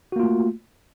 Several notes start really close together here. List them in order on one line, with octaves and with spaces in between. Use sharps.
F#4 A#3 F4 A3